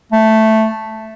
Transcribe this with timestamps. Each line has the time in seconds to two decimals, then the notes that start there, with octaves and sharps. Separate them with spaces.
0.12 A3